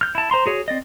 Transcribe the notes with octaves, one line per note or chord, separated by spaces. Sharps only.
F6 G6
E4 A5
C5 A#5 C6
F#4 G#4 C#5
C4 D5 D#5